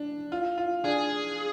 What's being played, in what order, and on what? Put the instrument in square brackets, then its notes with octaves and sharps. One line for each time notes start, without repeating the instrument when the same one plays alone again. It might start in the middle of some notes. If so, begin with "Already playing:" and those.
Already playing: [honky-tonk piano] D4
F4
F4
[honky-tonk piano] D4 [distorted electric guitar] G#4